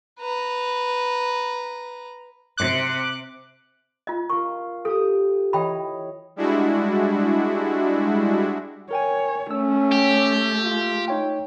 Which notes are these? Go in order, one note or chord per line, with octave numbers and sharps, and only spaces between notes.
B4 A#5
C3 D6 F#6
F4 D#5
F4 A#4 C#6
G4 A4 G5 D#6
E3 C#5 D#5 G5 B5
G3 G#3 D4 E4 F#4
A#4 C#5 G5 G#5
A3 C#4 E6
G4
F4
D#4 C#5 G5